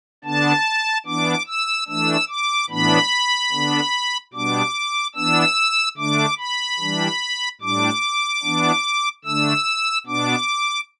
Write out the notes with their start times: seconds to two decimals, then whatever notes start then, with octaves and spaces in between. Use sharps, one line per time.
0.24 D3 B3 D4 A5
1.06 E3 B3 D4 D6
1.47 E6
1.88 E3 A3 D4 E6
2.29 D6
2.70 A2 E3 B3 D4 B5
3.52 D3 B3 D4
4.33 B2 G3 B3 D4 D6
5.15 E3 B3 D4 E6
5.97 D3 A3 D4 D6
6.38 B5
6.79 E3 G3 D4
7.61 A2 G3 D4 D6
8.43 E3 B3 D4
9.25 D3 A3 D4 E6
10.06 B2 B3 D4 D6